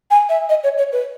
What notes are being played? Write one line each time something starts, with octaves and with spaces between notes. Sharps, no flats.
G#5
E5
D#5
C#5
C#5
B4